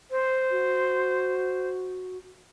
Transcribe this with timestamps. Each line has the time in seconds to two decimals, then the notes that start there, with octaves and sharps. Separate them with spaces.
0.11 C5
0.51 F#4